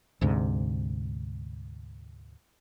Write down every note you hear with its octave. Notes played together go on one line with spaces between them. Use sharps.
D2 G#2 C3